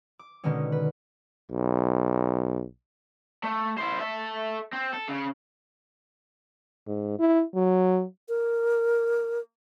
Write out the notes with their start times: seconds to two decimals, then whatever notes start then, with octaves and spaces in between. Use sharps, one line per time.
0.19 D6
0.44 B2 D3 D#3 G#3 C#4
0.72 B4
1.50 B1
3.44 A3
3.78 E4 C5
4.00 A4 E5
4.73 C4
4.93 A4
5.09 C#3
6.87 G#2
7.19 E4
7.55 F#3
8.28 A#4